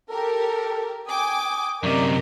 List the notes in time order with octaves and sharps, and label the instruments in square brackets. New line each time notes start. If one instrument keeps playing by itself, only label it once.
[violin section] G4 A#4 [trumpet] A4
[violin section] G5 G#5 D6 [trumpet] D#6
[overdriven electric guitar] F#2 C3 [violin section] A#4 D#5 A#5 [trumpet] D5